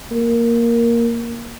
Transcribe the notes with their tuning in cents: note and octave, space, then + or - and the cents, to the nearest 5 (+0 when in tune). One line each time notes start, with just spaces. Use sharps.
A#3 +0